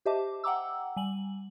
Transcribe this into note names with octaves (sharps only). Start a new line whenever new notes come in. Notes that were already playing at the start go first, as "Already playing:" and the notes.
G4 C5 D#5 E5 A5 D6
F#5 G5 A#5 D6 E6
G3 G#5 F#7